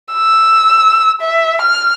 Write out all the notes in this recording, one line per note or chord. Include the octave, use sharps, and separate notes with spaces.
E6
E5
F6